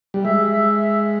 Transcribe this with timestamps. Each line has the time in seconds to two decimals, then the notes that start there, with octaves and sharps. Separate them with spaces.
0.14 G3
0.24 G#3 E5
0.52 E5
0.78 E5